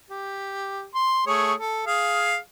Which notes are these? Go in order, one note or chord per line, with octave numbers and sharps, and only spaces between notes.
G4
C6
A3 G#4 C#5
A4
G#4 F5